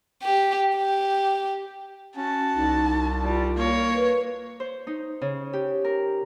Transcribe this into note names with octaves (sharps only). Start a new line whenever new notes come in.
G4
G4
C#4 F#4 A5
C2 D#4
G3 F4
A#3 C#5
B4
C5
D#4
C#3
G4
A#4